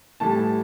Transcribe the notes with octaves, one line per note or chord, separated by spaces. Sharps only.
A2 E3 G3 A5